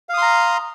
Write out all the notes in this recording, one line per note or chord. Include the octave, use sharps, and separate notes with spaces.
F5 A#5 C6 D#6